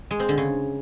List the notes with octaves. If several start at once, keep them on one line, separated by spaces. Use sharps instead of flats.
G#3
C4
D3
C#3